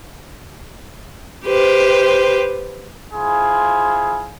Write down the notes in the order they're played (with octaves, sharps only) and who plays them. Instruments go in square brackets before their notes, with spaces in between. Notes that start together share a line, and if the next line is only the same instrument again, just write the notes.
[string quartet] G4 B4 C5
[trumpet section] E4 F4 G#4 C5